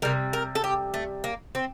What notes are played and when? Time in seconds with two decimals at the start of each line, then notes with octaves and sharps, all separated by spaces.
0.02 C3 G3 A#4
0.33 A#4
0.55 A4
0.64 G4
0.94 A3
1.24 A#3
1.55 C4